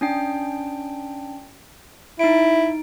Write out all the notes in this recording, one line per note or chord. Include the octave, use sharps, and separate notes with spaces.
C#4 D4 G5
D#4 E4 D7